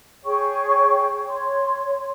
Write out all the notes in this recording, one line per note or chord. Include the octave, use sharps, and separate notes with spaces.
G#4 C#5 G5 C#6
C#5 C6